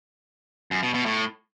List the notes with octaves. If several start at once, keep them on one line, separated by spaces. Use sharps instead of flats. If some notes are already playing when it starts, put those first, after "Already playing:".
F#2
B2
B2
A2